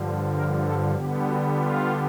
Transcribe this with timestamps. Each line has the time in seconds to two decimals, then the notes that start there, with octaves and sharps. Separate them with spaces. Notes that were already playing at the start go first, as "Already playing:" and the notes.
Already playing: G2 D3 F3
0.35 A#4
0.65 A4
0.95 D3 G3 B3 G4
1.26 F#4
1.57 F4